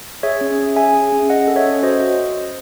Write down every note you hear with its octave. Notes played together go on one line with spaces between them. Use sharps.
G#4 C#5 E5
C#4
C#4
G#4 E5 G#5
G#4
C#4
C#4 D#5 F#5
A4
C#5 E5
C#4
F#4 C5 D#5